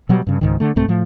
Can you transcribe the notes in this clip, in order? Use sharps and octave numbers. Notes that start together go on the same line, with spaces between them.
B2 F#3 G3
G2 C#3
C#2 G#2 D#3
D3 A3
C2 G#2 A3 C4
A2 F3 A3